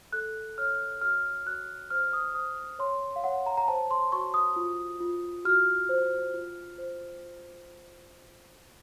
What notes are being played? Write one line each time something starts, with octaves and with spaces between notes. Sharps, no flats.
A4 F#6
C#5 F6
F#4 F6
F#4 F#6
C5 F6
D#6
C5 D#6
C#5 C6
F5
C#5 F#5
A#5
A#5
C5 A5
C6
F#4 C#6
D#6
F4
F4
F#4 F6
C5
F4
C5